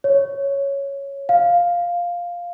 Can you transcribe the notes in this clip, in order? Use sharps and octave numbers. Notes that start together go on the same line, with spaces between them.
C#5
F5